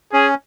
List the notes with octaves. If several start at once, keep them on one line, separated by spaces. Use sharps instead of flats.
C#4 G#4